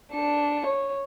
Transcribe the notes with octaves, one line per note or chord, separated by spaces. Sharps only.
D4 C#7
C#5